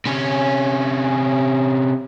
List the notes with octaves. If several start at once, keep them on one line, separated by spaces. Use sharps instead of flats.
C3 C#4